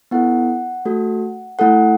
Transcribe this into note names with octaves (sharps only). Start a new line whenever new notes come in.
B3 E4 A4 F#5
A3 F#4 A4
A3 E4 A4 F#5